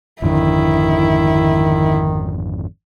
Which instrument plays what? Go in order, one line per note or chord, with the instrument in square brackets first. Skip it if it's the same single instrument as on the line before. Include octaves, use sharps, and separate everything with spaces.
[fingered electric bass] G#1 F2 D3 [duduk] D#3 [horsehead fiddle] E4